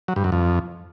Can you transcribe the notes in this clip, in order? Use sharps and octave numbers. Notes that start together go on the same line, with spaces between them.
F#3
G2
F#2
F2